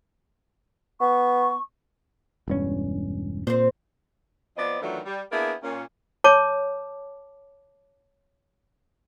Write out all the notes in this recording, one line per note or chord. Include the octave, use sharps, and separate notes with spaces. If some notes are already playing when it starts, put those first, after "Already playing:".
B3 C#6
E1 G2 C#4
A#2 C4 C5
F3 B3 C4 D5 D#5
D#3 E3 F#3 A3 D4 F4
G3
A#3 B3 D4 E4 G#4 A#4
A#2 C#4
C#5 A5 D6